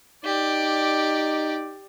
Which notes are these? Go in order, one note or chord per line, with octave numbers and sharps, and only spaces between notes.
D#4 G4 D5